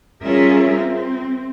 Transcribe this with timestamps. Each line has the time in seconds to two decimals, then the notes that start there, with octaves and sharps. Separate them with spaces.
0.23 G3 C#4 F4 G#4 A#4 E5
0.75 C4